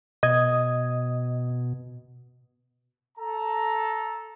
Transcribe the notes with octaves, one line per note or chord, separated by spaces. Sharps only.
B2 D#5 D#6 G#6
A4 A#5